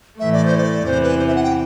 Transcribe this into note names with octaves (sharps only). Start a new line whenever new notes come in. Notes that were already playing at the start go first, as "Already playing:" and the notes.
A2 E3 A3 E5
D5
C5
D5
E2 C3 E3 C5
B4
C5
E5
F#5
G5